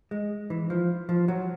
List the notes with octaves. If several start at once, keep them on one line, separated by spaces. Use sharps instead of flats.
G#3
E3
F3
F3
F#3